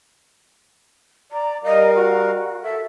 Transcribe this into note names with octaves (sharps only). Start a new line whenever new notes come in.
D5 A#5
G3 A#4 D#5 F5
F#4
A4 E5